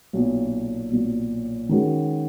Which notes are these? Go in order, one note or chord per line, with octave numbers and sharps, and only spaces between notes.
B1 A#2 F#3
B1 A#2 F#3
D#3 G#3 C#4 F#4